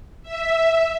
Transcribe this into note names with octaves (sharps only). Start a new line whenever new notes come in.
E5